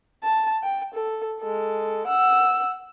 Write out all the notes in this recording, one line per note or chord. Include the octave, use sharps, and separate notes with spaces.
A5
G5
A4
G#3 A4
F#5 E6